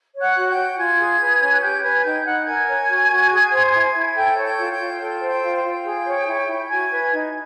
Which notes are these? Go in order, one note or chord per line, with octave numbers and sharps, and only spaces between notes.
C#5
F#5 F#6
F#4
G5 G6
F#4
F4 G#5 G#6
G#4
B4
C#4
F#6
G4 G5 G6
B4 G#5 G#6
D#4 G5 G6
D#4 F#5 F#6
A#4 G#5 G#6
C#5
F#4
F#4
G#4
C5
E4
E4
A4 G5 G6
C#5
G5 G6
F4
G5 G6
F4
A4 G5 G6
C5
G5 G6
F4
G5 G6
F4
G#4
C#5
E4
E4
F#4 G#5 G#6
B4
D#4